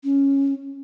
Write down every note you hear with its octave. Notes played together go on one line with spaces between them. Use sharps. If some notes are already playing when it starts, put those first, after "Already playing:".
C#4